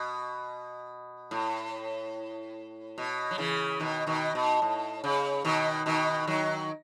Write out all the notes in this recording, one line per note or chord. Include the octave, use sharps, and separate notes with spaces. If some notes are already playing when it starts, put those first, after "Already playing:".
Already playing: B2
A2
B2
F#3
C#3 E3
B2 D#3
B2 D#3
B2
A2
C#3
B2 D#3
B2 D#3
D#3 F#3